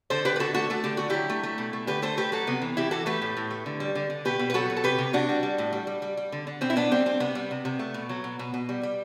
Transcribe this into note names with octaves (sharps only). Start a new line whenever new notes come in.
D3 A4 C5
D3 G4 B4
B4
D3 F#4 A4
A3 F#4 A4
A3 A4
D3 G4
D3 F#4
F#3 E4 G4
A3
A3
B2
A3
D3 G4 B4
A3 A4 C5
A3 G4 B4
F#3 F#4 A4
C3 B3
E3
C3 E4 G4
E3 F#4 A4
A3 G4 B4
A2
A2
A3
D3
G3
D3
D3
B2 G4 B4
B2
B4
F#3 F#4 A4
B2
A4
C3 G4 B4
C3
C3 D4 F#4
G3
G3
A2
G3
G3
G3
G3
D3
D3
B2 C4
E4
B2 B3 D4
G3 C4
G3 C4
C3 B3
G3
C3
C3
A3
B2
F#3
B2
B2
B2
G3
G3